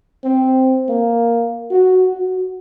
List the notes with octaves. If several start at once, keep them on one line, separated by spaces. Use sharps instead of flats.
C4
A#3
F#4
F#4